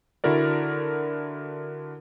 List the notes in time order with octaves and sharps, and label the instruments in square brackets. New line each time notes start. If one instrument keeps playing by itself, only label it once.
[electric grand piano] D3 E4 F#4 A#4 D5